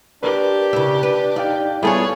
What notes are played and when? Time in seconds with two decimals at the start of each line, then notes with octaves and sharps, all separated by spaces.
0.23 D4 G4 A#4 B4
0.73 C#3 E4
1.03 B4
1.36 D#4 D5 F5 G5
1.83 G3 B3 E4 F4 G#4 A4 C#5 G#5